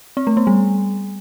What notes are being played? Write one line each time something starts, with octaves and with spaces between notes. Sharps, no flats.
C4
A3
B3
G3